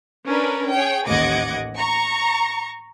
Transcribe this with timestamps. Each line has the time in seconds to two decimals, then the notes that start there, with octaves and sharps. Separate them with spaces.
0.25 C#4 D4 A#4 B4
0.69 G#4 C#5 G5
1.07 A1 D#2 D#5 F#5 D6 G#6
1.77 A#5 C#6